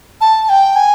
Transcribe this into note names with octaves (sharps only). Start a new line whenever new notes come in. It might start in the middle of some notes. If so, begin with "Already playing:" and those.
A5
G5
G#5